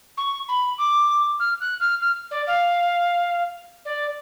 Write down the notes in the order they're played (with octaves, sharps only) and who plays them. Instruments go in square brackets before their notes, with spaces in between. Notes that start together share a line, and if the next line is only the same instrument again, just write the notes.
[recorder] C#6
B5
D6
F6
F#6
F6
F6
D5
F5
D5